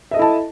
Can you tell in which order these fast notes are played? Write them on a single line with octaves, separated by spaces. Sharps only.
E5 D#5 A4 E4 A5